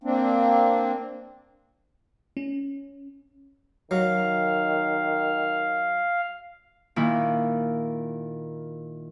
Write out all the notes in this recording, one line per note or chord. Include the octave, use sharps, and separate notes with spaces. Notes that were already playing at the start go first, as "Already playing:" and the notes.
A#3 C4 D4
C#4
D#3 F#3 F5
A#2 D#3 E4